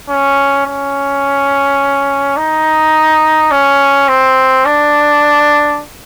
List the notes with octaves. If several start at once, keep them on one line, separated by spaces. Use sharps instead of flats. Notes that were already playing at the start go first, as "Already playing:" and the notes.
C#4
C#4
D#4
C#4
C4
D4